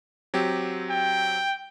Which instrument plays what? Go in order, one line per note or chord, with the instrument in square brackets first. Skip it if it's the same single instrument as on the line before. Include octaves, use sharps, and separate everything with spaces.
[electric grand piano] F#3 C4 G4
[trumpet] G5